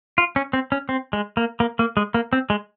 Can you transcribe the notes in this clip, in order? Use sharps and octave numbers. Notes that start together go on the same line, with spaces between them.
F4
C#4
C4
C#4
C4
G#3
A#3
A#3
A#3
G#3
A#3
C4
G#3